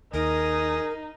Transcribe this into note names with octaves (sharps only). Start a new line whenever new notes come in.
D#2 D#4 G#4 A#4 D#6